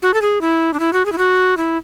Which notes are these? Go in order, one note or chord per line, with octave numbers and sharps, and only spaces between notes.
F#4
A4
G#4
E4
D4
E4
F#4
G#4
E4
F#4
E4